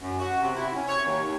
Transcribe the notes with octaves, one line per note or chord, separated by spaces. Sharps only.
F#2
F#4
C3
E4
C#4
C#5
D#2